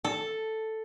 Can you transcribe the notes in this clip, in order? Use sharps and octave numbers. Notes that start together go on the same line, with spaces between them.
A4